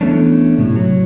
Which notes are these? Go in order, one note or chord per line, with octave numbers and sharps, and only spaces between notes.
E3 A3 B3 C#4 D4
A2 C3
F#3